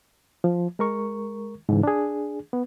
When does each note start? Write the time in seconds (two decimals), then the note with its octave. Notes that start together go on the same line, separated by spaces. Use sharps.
0.44 F3
0.79 G#3 A#4 C#6
1.69 G#2 C#3 E3
1.83 D4 G#4
2.53 B3